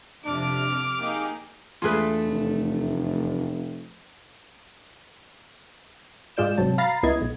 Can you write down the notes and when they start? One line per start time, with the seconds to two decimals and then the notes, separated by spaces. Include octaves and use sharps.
0.25 F2 C3 D4 D6 F6
1.00 A#3 D#4 G4 G#4
1.82 E2 A3 D4 F4 G#4 B4
2.26 F1
6.37 G#2 G#3 F4 D5 G6 E7
6.58 G#1 C3 F#3 A5
6.78 F5 A#5 B5 A6 C7
7.03 C#2 B3 E4 D#5 G#6
7.21 B1